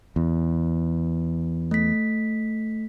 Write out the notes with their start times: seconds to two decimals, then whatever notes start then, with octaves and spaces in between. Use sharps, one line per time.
0.16 E2
1.71 A3 B6